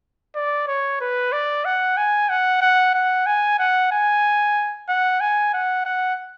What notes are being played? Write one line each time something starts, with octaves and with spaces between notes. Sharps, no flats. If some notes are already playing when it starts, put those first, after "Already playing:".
D5
C#5
B4
D5
F#5
G#5
F#5
F#5
F#5
G#5
F#5
G#5
F#5
G#5
F#5
F#5